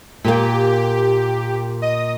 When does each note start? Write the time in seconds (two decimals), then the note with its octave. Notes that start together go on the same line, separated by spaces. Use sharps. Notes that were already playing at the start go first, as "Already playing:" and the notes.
0.25 A#2 A#3 G4
1.82 D#5 D#6